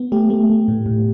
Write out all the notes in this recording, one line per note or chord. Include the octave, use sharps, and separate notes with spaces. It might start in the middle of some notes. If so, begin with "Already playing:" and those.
Already playing: B3
A3 G4
A3
A3
A2
A2